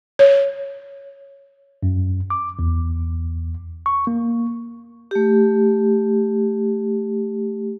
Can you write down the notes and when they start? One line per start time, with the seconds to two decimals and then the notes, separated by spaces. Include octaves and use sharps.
0.19 C#5
1.83 F#2
2.30 D6
2.59 E2
3.86 C#6
4.07 A#3
5.11 A3 G4